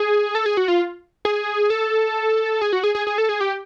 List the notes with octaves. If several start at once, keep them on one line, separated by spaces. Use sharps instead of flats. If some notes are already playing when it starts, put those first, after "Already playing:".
Already playing: G#4
A4
G#4
F#4
F4
G#4
A4
G#4
F#4
G#4
G#4
G#4
A4
G#4
G4